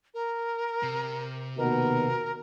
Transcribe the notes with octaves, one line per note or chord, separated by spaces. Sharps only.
A#4
C3
D#2 B2 A#4